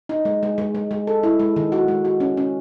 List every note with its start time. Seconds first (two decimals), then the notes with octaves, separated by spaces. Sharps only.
0.09 D#4
0.25 G#3
0.43 G#3
0.58 G#3
0.75 G#3
0.91 G#3
1.07 A4
1.23 E4
1.39 G#3
1.56 D#3
1.72 F#4
1.88 G#3
2.05 F#4
2.20 C#4
2.37 C#4